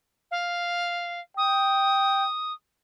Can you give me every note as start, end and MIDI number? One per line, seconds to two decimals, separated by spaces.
0.31 1.20 77
1.37 2.26 79
1.37 2.53 87